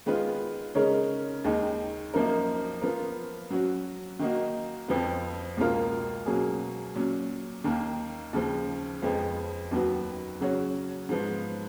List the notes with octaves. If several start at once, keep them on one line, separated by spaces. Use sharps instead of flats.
D#3 G#3 B3 F4 B4
C#3 G#3 D#4 A#4 C#5
D#2 D#3 G#3 D#4
F#2 F3 A#3 D#4 A#4
F3 B3 F4 A#4
F#3 C#4 F#4
D#3 A#3 D#4 F#4
F2 F3 B3
C#2 B2 A#3 F4 A#4
B2 F#3 A#3 C#4 G#4
A#2 F#3 C#4
D#2 D#3 A#3
D#2 C#3 F3
F2 F3 G#3 B3
D#2 D#3 F#3 B3 F#4
C#3 F#3 C#4 F#4 C#5
G#2 F3 B3